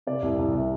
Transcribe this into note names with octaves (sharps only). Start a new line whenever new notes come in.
C3 D5
C2
C2
C3